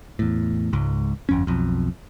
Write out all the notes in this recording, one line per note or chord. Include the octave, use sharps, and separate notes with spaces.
E2 A2
C#2 G#2
G1 F2 C#4
B1 F2